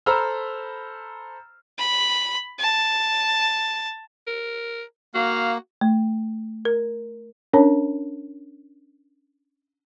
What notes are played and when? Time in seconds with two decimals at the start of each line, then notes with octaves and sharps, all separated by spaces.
0.06 A4 C5 A#5 B5 E6 F6
1.78 B5
2.59 A5
4.27 A#4
5.15 A#3 F#4 F5
5.81 A3
6.65 A#4
7.53 C#4 D4 A#4 C#5 A5